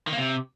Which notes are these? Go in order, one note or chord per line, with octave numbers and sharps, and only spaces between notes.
D#3
A#3
C3